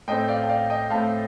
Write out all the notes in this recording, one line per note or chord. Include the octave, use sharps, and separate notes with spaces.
A2 A3 C4 D#5 G5
D5 F5
G5
D5 F5
D#5 G5
A2 A3 C4 F5 A5